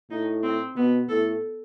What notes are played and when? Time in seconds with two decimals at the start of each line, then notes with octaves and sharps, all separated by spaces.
0.11 A2 D#4
0.43 C4
0.77 B2 B3
1.09 A2 A4